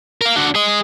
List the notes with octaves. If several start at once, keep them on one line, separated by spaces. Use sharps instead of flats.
A#4 F5
D4 F#4
G#4 D#5